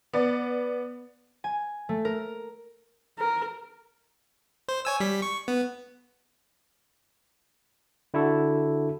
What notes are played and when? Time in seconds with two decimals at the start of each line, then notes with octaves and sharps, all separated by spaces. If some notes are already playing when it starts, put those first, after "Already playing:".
0.13 B3 D5
1.44 G#5
1.89 A3
2.05 A#4
3.19 A#4
4.68 C5
4.85 C#5 G#5 E6
5.00 G3 B6
5.22 C#6
5.48 B3
8.14 D3 E4 F#4 A4